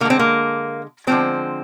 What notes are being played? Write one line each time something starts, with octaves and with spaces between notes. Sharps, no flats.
D3 G#3 A#3 C4
A#3
D3 F3 G#3 C4